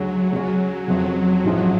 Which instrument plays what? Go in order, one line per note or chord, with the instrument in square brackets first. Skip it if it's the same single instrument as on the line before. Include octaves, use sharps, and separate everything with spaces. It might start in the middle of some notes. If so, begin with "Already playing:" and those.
Already playing: [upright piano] D2 C#3 G#3 C#4 [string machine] F#3
[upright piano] C#3 G#3 C#4
[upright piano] F1 F2 C#3 [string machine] F#3
[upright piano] A1 G#2 F3 [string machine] F#3